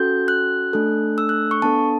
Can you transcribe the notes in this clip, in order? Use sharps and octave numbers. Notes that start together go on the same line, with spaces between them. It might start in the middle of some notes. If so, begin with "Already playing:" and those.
Already playing: C#4 F#4 A4 G6
F#6
A3 D4 A4
E6
F#6
C#6
B3 D4 A4 A5